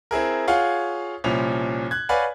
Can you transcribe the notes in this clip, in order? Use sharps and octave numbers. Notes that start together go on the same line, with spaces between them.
C4 E4 G#4 A#4
F4 G#4 C#5 F5 F#5
C2 A#2 F3 C#4 F7
F#6 G#6
B4 C#5 D5 F5 F#5 G#5